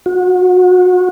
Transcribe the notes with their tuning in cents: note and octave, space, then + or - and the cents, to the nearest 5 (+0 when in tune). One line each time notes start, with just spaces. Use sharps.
F#4 -30